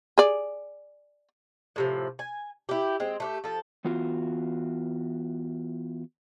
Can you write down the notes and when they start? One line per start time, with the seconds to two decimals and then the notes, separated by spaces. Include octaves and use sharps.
0.18 G#4 D5
1.76 A2 C3 F3
2.19 G#5
2.69 E4 G4
3.00 G#3 C4
3.20 A3 F#4 G4
3.44 F3 A4
3.85 E3 B3 F4 F#4